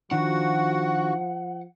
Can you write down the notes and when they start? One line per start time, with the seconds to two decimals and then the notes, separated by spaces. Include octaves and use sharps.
0.11 D#3 F3 D4 F#4 F#5